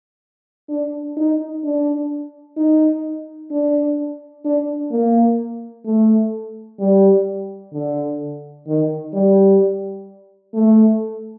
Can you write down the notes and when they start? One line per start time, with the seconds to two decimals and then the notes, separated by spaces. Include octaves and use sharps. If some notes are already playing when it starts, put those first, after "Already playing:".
0.70 D4
1.17 D#4
1.64 D4
2.57 D#4
3.51 D4
4.45 D4
4.91 A#3
5.86 A3
6.80 G3
7.73 D3
8.67 D#3
9.14 G3
10.54 A3